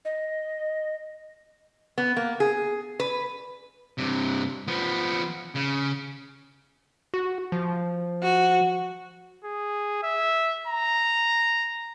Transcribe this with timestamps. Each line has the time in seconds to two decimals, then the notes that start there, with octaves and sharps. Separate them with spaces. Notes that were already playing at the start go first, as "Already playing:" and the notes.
0.05 D#5
1.98 B3
2.17 A#3
2.40 G#4
3.00 B4
3.98 G2 C3
4.68 F3 B3
5.55 C#3
7.14 F#4
7.52 F3
8.22 F#4
9.45 G#4
10.03 E5
10.67 A#5